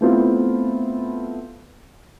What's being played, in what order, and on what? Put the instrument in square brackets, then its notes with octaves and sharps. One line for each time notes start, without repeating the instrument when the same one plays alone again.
[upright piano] A3 B3 C4 E4 F4